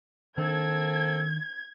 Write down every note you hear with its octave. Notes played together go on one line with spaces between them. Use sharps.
D#3 A#3 C4 D4 A4 G#6